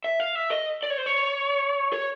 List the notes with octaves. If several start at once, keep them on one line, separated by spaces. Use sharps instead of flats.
E5
F5
E5
D#5
D5
C#5
C5
C#5
C#5